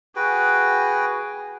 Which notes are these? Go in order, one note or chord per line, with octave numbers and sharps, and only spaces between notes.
F#4 G#4 B4 G5